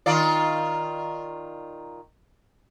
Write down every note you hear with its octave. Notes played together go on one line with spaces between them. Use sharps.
D#3 F4 D5